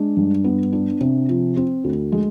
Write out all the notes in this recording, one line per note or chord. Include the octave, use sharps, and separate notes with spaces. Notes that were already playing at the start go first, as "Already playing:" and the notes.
Already playing: G#3 D4
G2
B3
D4
C3
F3
C4
D2
G#3